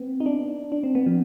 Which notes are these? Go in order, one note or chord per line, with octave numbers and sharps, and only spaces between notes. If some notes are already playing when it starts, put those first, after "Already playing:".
Already playing: B3 C4
D#4
D4
D4
C4
B3
F3